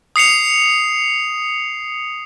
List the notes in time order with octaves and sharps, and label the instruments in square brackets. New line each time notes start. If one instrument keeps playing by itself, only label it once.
[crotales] D#6 C7 C#7 F7